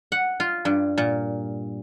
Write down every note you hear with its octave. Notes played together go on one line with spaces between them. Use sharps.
F#5
F4
G2
A#2